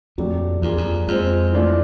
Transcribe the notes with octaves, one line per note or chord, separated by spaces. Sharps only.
F2 A#2 F#3 A3 D4 G4
E2 F3 A#3 D4 F4 G#4
F2
F2 F3 G#3 C4
E3 A3 D4 F4